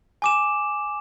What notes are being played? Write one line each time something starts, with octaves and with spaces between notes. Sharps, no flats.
G#5 D6 E7